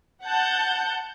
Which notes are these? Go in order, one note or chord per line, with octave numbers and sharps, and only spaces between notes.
F#5 A5 G6